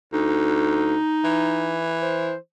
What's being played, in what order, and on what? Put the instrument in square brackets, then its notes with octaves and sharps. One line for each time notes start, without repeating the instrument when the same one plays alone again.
[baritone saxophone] D2 [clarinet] D#4
[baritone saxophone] E3
[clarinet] C5